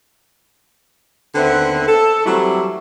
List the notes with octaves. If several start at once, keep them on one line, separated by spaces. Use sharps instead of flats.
D#2 D3 B3 C4 E5 F#5
A4
E3 F#3 G3 A3 C4 E4